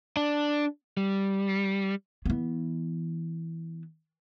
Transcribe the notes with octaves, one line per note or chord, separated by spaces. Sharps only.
D4
G3
E3 B3